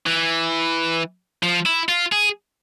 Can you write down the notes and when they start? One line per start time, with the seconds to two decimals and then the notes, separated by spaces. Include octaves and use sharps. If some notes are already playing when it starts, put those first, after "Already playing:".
0.07 E3
1.43 F3
1.66 E4
1.89 F4
2.12 G#4